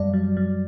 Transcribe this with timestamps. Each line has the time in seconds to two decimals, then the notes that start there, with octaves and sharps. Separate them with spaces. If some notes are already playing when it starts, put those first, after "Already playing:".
Already playing: F#2 G3 D5
0.13 F#3
0.37 F#3